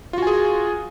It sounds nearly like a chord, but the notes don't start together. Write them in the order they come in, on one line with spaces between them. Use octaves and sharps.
F4 F#4 G#5 G#4